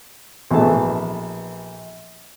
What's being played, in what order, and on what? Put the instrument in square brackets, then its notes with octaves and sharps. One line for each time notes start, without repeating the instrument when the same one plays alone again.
[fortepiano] A#1 B2 E3 A3 A5